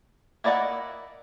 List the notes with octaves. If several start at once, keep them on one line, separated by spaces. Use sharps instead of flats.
A#3 E4 D5 D#5 F#5